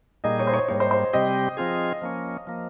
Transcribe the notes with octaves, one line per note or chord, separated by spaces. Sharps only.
A#2 G3 A#3 D#4 G#4 D#5
C#5
C5
C#5
G#2 G3 A#3 C#5
C5
C5
C3 G3 C4 G4 D#5
F3 C4 F4 G#4
F3 A#3 C#4
F3 A#3